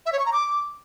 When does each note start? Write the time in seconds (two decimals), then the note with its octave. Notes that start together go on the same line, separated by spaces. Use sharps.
0.06 E5
0.12 C#5
0.19 C#6
0.26 A#5
0.33 D6